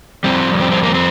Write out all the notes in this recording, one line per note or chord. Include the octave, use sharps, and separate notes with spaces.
F2 C3 G3 C4
C4
C4
A#3
C4